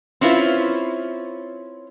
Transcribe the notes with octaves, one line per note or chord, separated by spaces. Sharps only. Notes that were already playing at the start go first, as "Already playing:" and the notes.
C4 C#4 E4 F4 B4